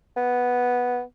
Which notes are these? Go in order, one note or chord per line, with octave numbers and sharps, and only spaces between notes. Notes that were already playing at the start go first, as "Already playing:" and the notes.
B3